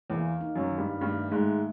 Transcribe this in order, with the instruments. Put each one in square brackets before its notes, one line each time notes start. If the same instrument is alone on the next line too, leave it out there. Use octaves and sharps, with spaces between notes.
[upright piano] E2 E3 [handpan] A#3
[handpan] D#4
[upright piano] F#2 F#3
[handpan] D#3
[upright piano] G2 G3
[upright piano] G2 G3 [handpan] A3
[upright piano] G#2 G#3 [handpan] A3